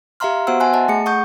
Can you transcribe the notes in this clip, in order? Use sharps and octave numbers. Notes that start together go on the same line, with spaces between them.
G4 E5 F5 A#5 C6 F6
B3 F#4 C5 F#5 E6
E5 F#5 G#5 A5 C6 F#6
D#5 A5
A3 G#4 C#7
F#5 C#6 D#6 G6